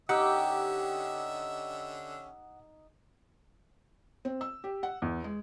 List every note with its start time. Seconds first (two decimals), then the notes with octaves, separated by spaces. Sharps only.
0.09 D3 C#4 D#4 G4 E5 F#5 E6
4.25 C4
4.41 E6
4.64 G4
4.83 F#5
5.02 E2
5.24 G#3